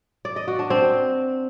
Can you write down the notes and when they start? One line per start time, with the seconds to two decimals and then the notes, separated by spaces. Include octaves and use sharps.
0.25 D5
0.36 D#5
0.48 F#4
0.59 D4
0.70 C4